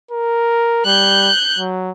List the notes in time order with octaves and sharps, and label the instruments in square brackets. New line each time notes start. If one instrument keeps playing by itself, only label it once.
[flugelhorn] A#4
[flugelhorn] G3 [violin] F#6 G6
[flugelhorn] F#3